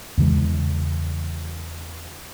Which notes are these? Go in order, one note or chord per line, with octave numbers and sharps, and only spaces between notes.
E2 C#3 E3 G#3